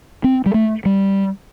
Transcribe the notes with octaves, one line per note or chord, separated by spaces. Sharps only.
C4
G3
A3
G3